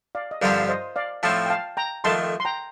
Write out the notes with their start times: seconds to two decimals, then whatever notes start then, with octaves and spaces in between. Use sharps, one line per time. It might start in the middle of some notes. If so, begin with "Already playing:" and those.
0.15 D5 F5
0.31 D#5
0.41 G2 D3 F3 C4 G4 A#4 D5
0.62 F5
0.69 C5 D#5
0.96 D5 F5
1.23 A2 F3 A3 C4 F5 A5
1.46 G5
1.50 F5 A5
1.77 G5 A#5
2.04 F2 D#3 A3 A5 C6
2.40 C6
2.45 G5 A#5